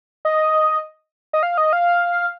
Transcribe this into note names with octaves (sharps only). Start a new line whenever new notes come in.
D#5
D#5
F5
D#5
F5